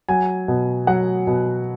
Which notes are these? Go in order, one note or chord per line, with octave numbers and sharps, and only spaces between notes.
F#3 G#5
B2
F#3 F#5
B2